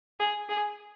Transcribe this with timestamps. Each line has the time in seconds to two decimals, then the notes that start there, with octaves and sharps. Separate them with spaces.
0.20 G#4
0.49 G#4